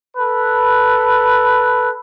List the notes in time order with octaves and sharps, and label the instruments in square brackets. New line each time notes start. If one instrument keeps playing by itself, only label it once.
[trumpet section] A4 B4